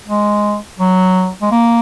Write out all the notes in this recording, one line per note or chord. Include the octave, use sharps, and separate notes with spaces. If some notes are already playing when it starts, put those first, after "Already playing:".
G#3
F#3
G#3
A#3